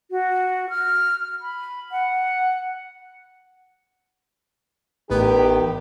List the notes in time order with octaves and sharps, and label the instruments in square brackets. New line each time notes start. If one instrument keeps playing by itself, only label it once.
[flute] F#4
F6
B5
F#5
[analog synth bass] A1 [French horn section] E2 D#3 G4 [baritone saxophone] B3